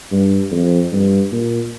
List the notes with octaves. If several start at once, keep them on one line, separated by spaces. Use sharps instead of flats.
G2
F2
G2
A#2